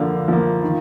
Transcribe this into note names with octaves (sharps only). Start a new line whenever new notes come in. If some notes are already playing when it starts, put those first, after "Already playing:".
Already playing: D3 F3 A#3
F3 A#3
D#3